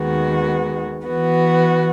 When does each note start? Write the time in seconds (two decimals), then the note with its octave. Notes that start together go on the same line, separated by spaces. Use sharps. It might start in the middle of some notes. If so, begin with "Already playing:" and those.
Already playing: D#2 D#3 G#3 B3 F#4
1.08 E3 B3 F#4